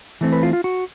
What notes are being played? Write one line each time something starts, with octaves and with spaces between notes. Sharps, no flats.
E3 A3 C4
B4
F4
F4
F#4